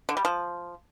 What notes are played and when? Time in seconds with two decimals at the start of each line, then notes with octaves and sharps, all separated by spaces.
0.09 D3
0.17 G3
0.25 F3